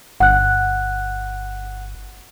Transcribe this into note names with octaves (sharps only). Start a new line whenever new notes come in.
G1 F#5 F#6